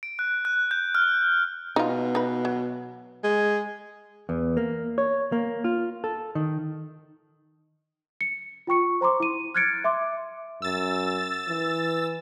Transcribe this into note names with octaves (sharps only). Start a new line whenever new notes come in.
D7
F#6
F#6
G6
F6
B2 D#4 F4
D#4 B4
F#3
G#3
E2
A#3
C#5
A#3
F4
A4
D#3
C#7
F4 G5 C#6 C#7
C5 A#5 C6 D6
E4 D#7
F6 F#6 G#6 A6 C#7 D7
E5 C6 D6
F#2 E6 A6
E3